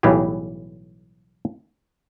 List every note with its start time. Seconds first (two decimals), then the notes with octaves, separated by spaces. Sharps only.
0.03 B1 A2 E3 G3 G4 G#4